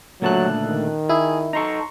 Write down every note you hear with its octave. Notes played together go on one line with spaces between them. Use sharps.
C#2 A#2 D3 F#3 A3 A5 F#6
D#3
E4 G#4
D#4 A4 A#5 C6 C#6